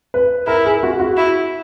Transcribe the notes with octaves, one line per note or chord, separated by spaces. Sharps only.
B4
E4 A#4
G#4
F#4
F#4
E4